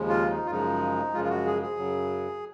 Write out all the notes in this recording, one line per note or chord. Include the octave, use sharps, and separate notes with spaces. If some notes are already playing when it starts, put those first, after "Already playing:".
Already playing: D#2 C#3 F3 G#3
F4
D#4
F4
F#2 C#3 F3 G#3 D#4
F#2 C#3 F3 G#3 F4
F4
F#4
G#4
G#4
F#2 C#3 F#3